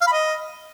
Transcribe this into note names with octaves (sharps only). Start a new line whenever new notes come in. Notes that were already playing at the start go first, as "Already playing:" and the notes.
F5
B5
D#5